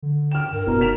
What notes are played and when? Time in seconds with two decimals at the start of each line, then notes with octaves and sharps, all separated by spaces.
0.03 D3
0.32 G5 F6 E7
0.52 G2 A#4
0.67 F1 B2 D#4 A#5
0.81 B6 E7 F7